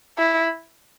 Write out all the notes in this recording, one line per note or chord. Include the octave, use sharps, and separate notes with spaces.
E4